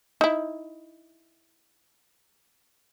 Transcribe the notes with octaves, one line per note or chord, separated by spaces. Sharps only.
D#4 E4